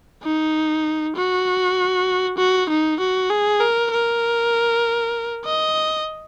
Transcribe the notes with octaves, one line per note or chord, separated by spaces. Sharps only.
D#4
F#4
F#4
D#4
F#4
G#4
A#4
A#4
D#5